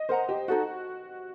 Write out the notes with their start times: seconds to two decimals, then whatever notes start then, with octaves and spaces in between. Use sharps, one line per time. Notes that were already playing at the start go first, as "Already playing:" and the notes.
Already playing: D#5
0.09 A#4 C5 F#5 A#5
0.29 G4
0.48 D#4 F#4 A4 D#5 F#5